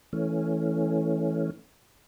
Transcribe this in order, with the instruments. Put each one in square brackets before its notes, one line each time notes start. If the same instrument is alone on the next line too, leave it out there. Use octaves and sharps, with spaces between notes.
[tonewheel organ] E3 A3 C#4